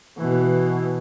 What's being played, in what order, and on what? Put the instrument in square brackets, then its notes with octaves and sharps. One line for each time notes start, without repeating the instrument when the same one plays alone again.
[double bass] B2 E3